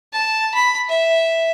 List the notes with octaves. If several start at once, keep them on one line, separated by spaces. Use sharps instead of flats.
A5
B5
E5